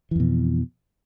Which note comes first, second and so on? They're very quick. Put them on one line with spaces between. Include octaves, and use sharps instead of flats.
E3 F2 B2